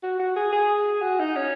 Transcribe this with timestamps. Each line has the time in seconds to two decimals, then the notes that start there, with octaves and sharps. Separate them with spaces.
0.03 F#4
0.19 F#4
0.36 G#4
0.52 G#4
1.02 F#4
1.19 D#4
1.36 C#4